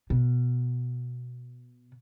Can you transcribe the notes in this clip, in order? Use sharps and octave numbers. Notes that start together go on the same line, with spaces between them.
B2